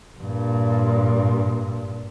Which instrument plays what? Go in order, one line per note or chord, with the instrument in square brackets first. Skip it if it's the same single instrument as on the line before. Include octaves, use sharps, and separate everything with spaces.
[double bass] G2 A#2